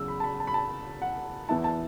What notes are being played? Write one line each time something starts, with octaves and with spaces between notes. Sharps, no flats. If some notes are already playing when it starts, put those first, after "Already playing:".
Already playing: E2 C#3 F#3 E6
B5
A5
B5
A5
B5
A5
F#5
E2 E3 B3 E4 A5
A5